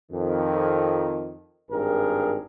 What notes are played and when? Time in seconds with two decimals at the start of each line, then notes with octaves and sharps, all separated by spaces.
0.12 F2 D#3
1.71 G#1 G2 G#4 A#4